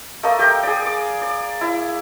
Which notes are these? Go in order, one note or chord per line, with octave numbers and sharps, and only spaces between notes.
A3 A#3 A#4 D#5
G4 G5 A#5
G#4 D5
D6
D5
E4